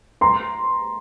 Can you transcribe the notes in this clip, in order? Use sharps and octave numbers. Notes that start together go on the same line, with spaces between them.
A#5 C6